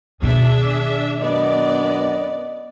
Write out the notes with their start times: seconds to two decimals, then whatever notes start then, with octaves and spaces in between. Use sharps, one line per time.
0.22 B2 D#3 D4 G#4 E5
1.21 F#2 B3 D4 D5 D#5